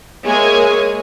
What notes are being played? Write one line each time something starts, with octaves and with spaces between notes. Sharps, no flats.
G#3 A#3 G#4 C#5 E5 G#5